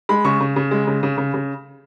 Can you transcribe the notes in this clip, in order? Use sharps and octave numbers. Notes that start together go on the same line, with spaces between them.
G#3 B5
C#3 C#6
C#3
C#3
G#3
C#3
C#3
C#3
C#3